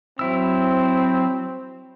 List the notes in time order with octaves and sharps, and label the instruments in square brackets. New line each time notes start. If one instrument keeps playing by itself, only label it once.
[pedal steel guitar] F#3 E4 E6 [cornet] C4